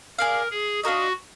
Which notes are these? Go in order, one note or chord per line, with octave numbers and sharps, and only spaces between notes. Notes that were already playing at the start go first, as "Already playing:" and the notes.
G#4 A#4 D5 F5
G#4
D4 F4 F#4 A#4 D#5